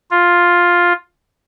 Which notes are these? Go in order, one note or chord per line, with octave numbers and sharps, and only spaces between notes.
F4